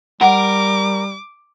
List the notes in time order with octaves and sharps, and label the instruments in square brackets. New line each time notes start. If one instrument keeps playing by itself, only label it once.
[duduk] G3 [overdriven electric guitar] A#4 [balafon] F#5 [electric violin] D6